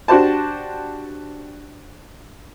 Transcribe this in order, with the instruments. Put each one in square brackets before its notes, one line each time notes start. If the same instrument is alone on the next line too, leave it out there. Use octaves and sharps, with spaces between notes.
[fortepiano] D4 F#4 G4 C5 A5